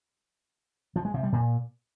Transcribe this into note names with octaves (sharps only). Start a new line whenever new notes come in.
F3
G#3
C3
G3
A#2